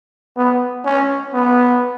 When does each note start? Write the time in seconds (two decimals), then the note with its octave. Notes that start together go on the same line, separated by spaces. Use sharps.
0.37 B3
0.85 C#4
1.34 B3